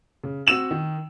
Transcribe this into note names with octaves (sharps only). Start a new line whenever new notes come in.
C#3
C4 F#4 E6 E7 F#7
D#3